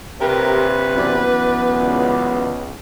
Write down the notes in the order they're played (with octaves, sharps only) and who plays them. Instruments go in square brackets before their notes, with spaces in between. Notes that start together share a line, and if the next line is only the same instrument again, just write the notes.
[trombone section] A#1 C3 [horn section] G4 A#4 [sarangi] B4
[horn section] F#2 E3 D5 [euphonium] B3
[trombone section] C#2